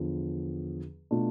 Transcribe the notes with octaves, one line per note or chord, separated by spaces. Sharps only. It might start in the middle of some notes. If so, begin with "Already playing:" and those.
Already playing: E2 D3 F3
B2 A3 D4 F4